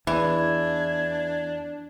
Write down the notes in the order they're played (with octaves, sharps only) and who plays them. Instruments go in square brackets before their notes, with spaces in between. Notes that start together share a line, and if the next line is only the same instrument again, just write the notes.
[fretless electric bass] E2 [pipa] E3 [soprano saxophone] D4 [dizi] G#6